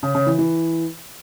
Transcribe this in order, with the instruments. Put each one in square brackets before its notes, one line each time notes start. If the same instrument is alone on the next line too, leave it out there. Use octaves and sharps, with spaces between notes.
[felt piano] C#3
C#3
E3
E3